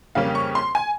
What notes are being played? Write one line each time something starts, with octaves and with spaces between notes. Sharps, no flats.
F2 C#3 G3 A#3 C#4 F5
C#6
C6
G#5